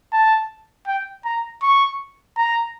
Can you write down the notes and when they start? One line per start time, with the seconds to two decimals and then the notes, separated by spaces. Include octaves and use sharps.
0.13 A5
0.87 G5
1.25 A#5
1.62 C#6
2.37 A#5